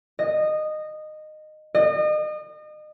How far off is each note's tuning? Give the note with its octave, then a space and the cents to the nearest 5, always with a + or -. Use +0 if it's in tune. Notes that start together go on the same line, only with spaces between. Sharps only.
D#5 -15
D#5 -35